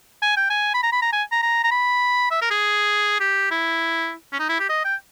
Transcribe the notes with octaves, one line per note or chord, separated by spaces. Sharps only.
G#5
G5
G#5
B5
A#5
B5
A#5
G#5
A#5
A#5
A#5
B5
E5
A#4
G#4
G4
E4
C#4
D#4
E4
G4
D#5
G5